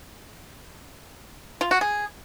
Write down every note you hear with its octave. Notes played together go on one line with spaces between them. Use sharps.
F4
F#4
G#4